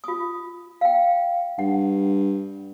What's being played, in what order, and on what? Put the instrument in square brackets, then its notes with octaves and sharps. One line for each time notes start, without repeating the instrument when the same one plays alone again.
[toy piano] F4 D#6
F5 G5
[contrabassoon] G2 [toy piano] F#5